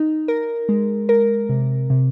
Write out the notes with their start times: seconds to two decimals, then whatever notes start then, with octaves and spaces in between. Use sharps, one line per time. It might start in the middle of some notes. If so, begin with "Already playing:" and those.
Already playing: D#4
0.28 A#4
0.69 G#3
1.09 A#4
1.49 C3
1.90 C3